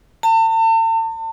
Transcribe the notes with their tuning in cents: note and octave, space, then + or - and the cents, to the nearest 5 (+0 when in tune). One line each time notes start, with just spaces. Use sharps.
A5 +40